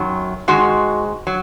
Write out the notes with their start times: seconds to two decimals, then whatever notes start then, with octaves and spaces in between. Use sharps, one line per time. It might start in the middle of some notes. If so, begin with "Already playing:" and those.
Already playing: F#2 D#3 F#3
0.48 G#2 D#3 G#3 F#4
1.27 F#3